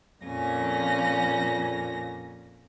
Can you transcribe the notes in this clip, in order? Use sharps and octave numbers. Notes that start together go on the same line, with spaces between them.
F2 A#2 C#4 A#6